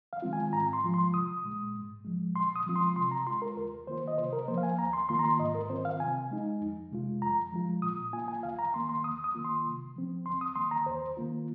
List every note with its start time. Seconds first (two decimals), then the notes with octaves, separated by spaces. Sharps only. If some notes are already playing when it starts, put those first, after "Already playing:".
0.13 F5
0.22 D#3 G#3 C4 F4
0.33 G#5
0.53 G#2 A#5
0.73 C6
0.84 F3 G#3 F4
0.94 C6
1.14 C2 D#6
1.44 A#2 G#3
1.75 G#2
2.05 F3 G#3
2.35 A#2 C6
2.56 D#6
2.66 F3 G#3 C4 F4
2.76 C6
2.96 C3 C6
3.11 A#5
3.27 G#3 F4 C6
3.42 A#4
3.57 D#2 A#4
3.87 D#3 A#3 F4 C5
4.08 D#5
4.18 C3 C5
4.33 A#4
4.48 F3 A#3 C5
4.58 F5
4.63 G#5
4.79 D#2 A#5
4.93 C6
5.09 D#3 A#3 F4 C6
5.19 A#5
5.24 C6
5.39 G#2 D#5
5.55 A#4
5.70 D#3 C4 F4 C5
5.85 F5
6.00 C3 G#5
6.31 G#3 D#4
6.61 F2
6.91 C3 G#3 F4
7.22 F2 A#5
7.52 F3 G#3 F4
7.82 A#2 D#6
8.13 A#3 F4 G#5
8.28 G#5
8.43 D#2 F5
8.59 A#5
8.74 D#3 A#3 C6
8.89 C6
9.04 D#2 D#6
9.24 D#6
9.35 D#3 A#3 F4
9.44 C6
9.65 C3
9.95 F3 C4
10.26 D#2 C6
10.41 D#6
10.56 D#3 A#3 C6
10.71 A#5
10.86 D#2 C5
11.17 D#3 A#3 F4